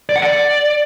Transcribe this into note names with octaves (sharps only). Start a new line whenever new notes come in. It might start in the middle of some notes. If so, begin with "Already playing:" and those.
D5
F#5
D5